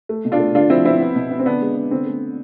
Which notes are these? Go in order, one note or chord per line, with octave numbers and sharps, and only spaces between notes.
A3
B2
D4 F4
A3
D3 D4 F4
F3 C4 E4
B3 C4 E4
B3
B2
B3
C4
D3 B3 D4
G#3
B3
D3 C4
A3